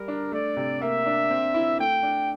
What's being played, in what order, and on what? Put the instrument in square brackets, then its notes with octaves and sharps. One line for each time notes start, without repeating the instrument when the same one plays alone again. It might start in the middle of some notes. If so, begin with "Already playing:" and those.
Already playing: [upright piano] G3 [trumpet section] A#4
[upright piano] D4
[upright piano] A3 [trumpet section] D5
[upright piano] C3
[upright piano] A#3 [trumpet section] E5
[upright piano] D4
C4
E4
[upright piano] A3 [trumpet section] G5
[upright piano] D4